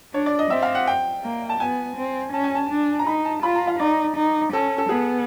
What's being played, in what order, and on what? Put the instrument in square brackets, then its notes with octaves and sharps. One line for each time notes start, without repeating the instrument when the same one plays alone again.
[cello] D4 [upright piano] C#5
[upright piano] D5
D#5
[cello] C4 [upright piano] E5
[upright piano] F5
F#5
G5
[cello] A#3
[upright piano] A5
[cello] B3 [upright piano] G#5
[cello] C4
[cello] C#4 [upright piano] A5
[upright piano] G#5
A5
[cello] D4
[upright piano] A#5
[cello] D#4 [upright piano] B5
[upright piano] A5
[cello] F4 [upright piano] B5
[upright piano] A#5
F5
[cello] D#4 [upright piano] D5
[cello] D#4
[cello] C#4 [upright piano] A4
[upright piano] A4
[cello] B3 [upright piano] G#4